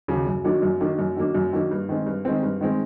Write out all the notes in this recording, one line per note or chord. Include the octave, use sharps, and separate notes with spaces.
D#2 C#3 F#3
F#2
D#3 F#3 A#3 D4
F#2
D#3 F#3 A#3 D4
F#2
D#3 F#3 A#3 D4
F#2
D#3 F#3 A#3 D4
G2
D#3 G#3 C4
G2
D#3 G#3 C4
G2
D#3 G#3 C4